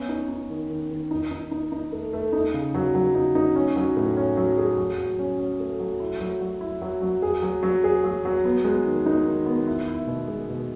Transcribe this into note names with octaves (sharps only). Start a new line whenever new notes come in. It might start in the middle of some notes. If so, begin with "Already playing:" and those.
Already playing: B3 C#4
D#4
D#4
D#3
D#3
D#3
D#4
D#4
D#4
D#4
A3
A3
D#4
C#3
F#3
F#3
D#4
D#4
C#4
F#3
A2
C#4
F#3
G#4
F#3
F#3
C#4
C#4
A3
F#3
E4
F#3
F#3
E4
F#3
F#3
G#4
F#3
F#3
G#4
F#3
F#3
B3
G#3
D#3
D#4
D#3
B3
E4
E4
B2
G#3
B2